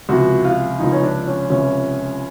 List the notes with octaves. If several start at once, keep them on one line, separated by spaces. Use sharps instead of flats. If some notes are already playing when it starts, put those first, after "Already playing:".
C#2 C3 F3 F#4
F4
C#2 C3 F3 D#4
C#4
D4
C#4
C#2 C3 F3 C#4